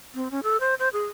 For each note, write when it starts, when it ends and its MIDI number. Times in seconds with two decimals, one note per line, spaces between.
0.15 0.31 60
0.31 0.40 61
0.43 0.59 69
0.60 0.75 72
0.79 0.89 72
0.93 1.04 68